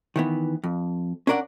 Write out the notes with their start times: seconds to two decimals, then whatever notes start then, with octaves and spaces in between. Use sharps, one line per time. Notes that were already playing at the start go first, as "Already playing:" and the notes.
0.16 D#3 E3 B3
0.64 F2
1.27 C#4 D4 A#4 D5 F#5